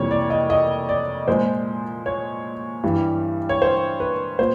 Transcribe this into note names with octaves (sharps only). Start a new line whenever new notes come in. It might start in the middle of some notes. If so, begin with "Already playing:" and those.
Already playing: F2 C3 E3 G3 A#3 C#5
D5
D#5
D#5
D5
A#2 F3 G#3 C5
C#5
G2 E3 G3
C#5
C5
B4
A#2 C5